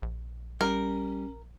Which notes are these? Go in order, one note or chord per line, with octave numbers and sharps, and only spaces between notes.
A#1
G3 C#4 A#4